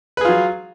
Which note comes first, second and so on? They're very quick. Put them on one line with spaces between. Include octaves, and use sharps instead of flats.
B4 G#4 F4 F#3